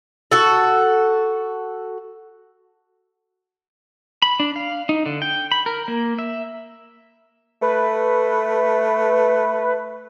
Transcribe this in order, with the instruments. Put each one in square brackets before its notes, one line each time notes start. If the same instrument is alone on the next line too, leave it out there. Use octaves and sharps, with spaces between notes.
[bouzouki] F#4 A4
[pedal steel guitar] B5
D4
F5
D#4
D3
G5
B5
A#4
A#3
E5
[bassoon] A3 [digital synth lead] B4